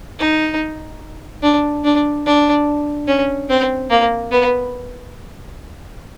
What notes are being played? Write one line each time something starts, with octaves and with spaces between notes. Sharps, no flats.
D#4
D4
D4
D4
C#4
C4
A#3
B3